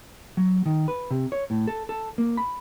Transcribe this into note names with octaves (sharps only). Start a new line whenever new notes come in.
F#3
D#3
B4
C3
C#5
A2
A4
A4
A#3
B5